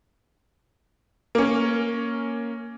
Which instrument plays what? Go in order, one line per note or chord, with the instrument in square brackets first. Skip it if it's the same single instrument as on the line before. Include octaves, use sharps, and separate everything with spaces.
[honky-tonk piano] A#3 C#4